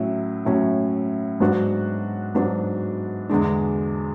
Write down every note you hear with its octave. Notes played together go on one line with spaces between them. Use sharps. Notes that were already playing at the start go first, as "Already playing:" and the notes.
Already playing: A2 F#3 C#4 E4
A2 F#3 C#4 E4
G#2 F#3 B3 D4 F#4
G#2 F#3 B3 D4 F#4
E2 D3 G#3 D4